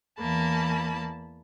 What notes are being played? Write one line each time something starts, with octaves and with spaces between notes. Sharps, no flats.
E2 E3 A#3 A5 B5